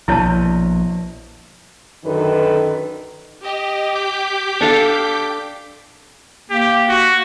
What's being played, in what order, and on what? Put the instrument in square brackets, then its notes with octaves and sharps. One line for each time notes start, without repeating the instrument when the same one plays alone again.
[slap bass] A#1 B2 [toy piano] E4 C#5 A5
[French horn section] F#2 D3 D#3 A4 B4
[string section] G4 [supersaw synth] D#5
[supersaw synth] D6 G6 B6
[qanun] D4 A4 F5
[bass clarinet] A#3 [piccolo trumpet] G4
[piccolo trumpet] F#4